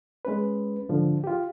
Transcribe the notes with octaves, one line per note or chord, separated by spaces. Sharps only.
G#3 C#4 B4
G#2 D3 F3
F4 G4